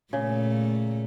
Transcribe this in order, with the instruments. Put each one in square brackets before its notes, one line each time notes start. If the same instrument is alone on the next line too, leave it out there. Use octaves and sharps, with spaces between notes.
[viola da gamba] A#2 A3 [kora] C#3